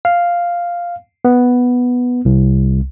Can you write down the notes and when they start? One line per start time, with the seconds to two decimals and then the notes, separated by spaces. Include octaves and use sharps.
0.05 F5
1.25 B3
2.25 C2